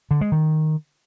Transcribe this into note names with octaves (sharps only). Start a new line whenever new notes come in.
D3
G#3
D#3